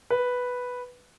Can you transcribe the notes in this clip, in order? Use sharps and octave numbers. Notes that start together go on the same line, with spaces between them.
B4